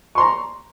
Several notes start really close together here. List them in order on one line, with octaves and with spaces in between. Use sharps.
C#6 C6 A#5